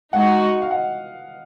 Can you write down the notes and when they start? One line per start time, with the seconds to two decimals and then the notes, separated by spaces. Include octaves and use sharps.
0.13 G#3 D#4 F#4 D#5 F#5
0.62 F5
0.70 D#5 F#5